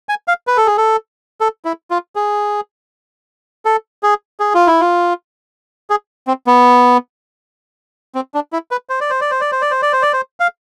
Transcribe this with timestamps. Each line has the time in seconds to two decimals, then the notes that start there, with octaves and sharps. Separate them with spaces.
0.09 G#5
0.28 F5
0.47 B4
0.57 A4
0.66 G#4
0.77 A4
1.41 A4
1.65 E4
1.91 F4
2.16 G#4
3.65 A4
4.03 G#4
4.40 G#4
4.54 F4
4.67 E4
4.81 F4
5.90 G#4
6.27 C4
6.47 B3
8.15 C4
8.34 D4
8.53 E4
8.71 B4
8.89 C5
9.01 D5
9.10 C5
9.21 D5
9.31 C5
9.41 D5
9.52 C5
9.62 D5
9.71 C5
9.82 D5
9.93 C5
10.02 D5
10.13 C5
10.40 F5